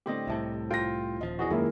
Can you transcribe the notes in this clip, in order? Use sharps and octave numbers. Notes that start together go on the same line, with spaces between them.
A2 D3 C4 G4 D#5
C2 A2 C3 E5 A5
F4 G5 A#6
D#1 F3 D#5
E2 F#4 G#4 D#5
F#2 D#3 G#3 A#3 E4 F4